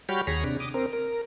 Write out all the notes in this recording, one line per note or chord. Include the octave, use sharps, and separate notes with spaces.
G3 F#4 C#5 G5 B5 F6
D#2 G#4 C#5 A#5 B5
C3 D4
D6 D#6
C4 A#4
A#4